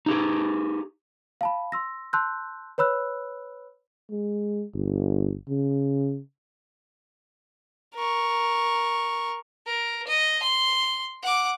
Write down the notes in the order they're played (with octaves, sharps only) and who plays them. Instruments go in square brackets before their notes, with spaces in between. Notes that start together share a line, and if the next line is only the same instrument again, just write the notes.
[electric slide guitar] D#4 G4 G#4
[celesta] F5 A5 B5
C6 E6 A#6
A5 C6 E6 F#6 G6
B4 C#5 B5 E6 F#6
[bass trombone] G#3
G1
C#3
[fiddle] A#4 C#6
[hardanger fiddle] A#4
D#5
C6
F#5 D6